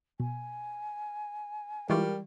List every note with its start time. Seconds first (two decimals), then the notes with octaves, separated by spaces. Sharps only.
0.20 B2 G#5
1.90 E3 G3 G#3 F4 A#4 C#6 D6